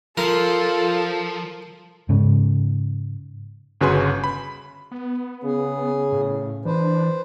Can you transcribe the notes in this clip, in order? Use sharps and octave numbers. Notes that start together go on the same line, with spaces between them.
F3 F4 A4 A#4
G#2 C#3
G1 C#3 F#4 B4 G#5 C6
B5
B3
C#3 G#4
A2
E3 D4 B4 C5